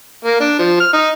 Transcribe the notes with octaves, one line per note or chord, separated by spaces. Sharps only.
A#3
D4
F3
F6
D#4